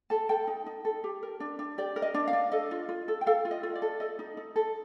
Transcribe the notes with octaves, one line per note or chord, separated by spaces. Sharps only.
A4 A5
A4 G5
D#4
D#4
A4
G4
A#4
D4
D4
G4 D5
A#4
D#5
D4
F5
D4
A4 D#5
F4
F4
A4
G5
A4 F5
F4
D#5
F4
D5
A4
A4 D#5
D#4
D#4
A4